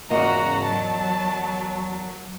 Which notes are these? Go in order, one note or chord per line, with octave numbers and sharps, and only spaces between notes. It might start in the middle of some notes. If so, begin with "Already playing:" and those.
E2 G#2 C#3 A#3 F#4 D#5 A#5
F#3 A5